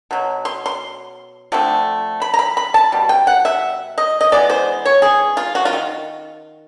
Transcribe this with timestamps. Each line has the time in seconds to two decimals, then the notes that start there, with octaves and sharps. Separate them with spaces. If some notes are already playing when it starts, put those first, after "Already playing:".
0.11 B2 F#3
0.45 C6
0.66 C6
1.52 D3 F3 A3 C4
2.22 B5
2.34 A#5
2.39 B5
2.57 B5
2.74 A5
2.92 B2 G3
3.09 G5
3.27 F#5
3.45 E5
3.98 D#5
4.21 D#5
4.32 E3 G#3 B3 D5
4.50 C5
4.85 C#5
5.02 G#4
5.37 F4
5.55 F#4
5.65 F4
5.73 D#3